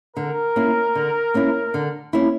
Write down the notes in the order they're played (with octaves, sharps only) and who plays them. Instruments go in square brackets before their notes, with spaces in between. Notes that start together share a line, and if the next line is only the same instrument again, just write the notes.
[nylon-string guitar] D3 [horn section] A#4
[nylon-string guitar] A#3 C#4 E4
D3
A#3 C#4 E4
D3
A#3 C#4 E4